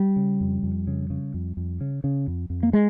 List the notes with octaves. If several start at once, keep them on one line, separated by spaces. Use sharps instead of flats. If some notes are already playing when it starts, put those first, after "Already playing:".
Already playing: G3
C#3
F2
F2
C#3
C#3
F2
F2
C#3
C#3
F2
F2
A#3
G#3